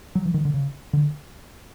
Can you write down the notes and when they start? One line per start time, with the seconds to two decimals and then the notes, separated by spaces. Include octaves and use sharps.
0.15 F#3
0.25 E3
0.34 D#3
0.45 D3
0.54 C#3
0.93 D3